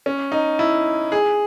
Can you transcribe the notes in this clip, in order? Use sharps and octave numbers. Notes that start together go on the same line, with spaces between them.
C#4
D#4
E4
G#4